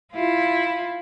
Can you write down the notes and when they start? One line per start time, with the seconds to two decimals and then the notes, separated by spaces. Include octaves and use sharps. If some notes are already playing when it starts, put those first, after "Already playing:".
0.12 E4 F4